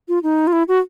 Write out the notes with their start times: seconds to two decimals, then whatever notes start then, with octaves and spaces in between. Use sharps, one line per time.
0.08 F4
0.23 D#4
0.47 F4
0.53 E4
0.68 F#4